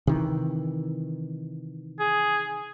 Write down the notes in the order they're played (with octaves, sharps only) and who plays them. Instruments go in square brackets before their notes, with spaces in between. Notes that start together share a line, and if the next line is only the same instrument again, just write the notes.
[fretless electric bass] C3 D#3 E3
[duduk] G#4